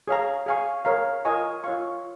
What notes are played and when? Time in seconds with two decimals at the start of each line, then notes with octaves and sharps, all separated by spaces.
0.08 G#4 C#5 F5 A#5
0.46 G#4 F5 G#5 C#6
0.85 A#4 C#5 F5 A#5
1.25 F4 A#4 D#5 G#5 C#6
1.64 F4 C#5 F5 C#6